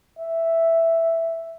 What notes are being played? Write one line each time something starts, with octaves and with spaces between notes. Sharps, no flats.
E5